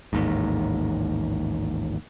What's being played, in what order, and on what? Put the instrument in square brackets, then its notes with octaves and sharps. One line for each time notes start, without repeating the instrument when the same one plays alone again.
[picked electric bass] A1 D#2 G#2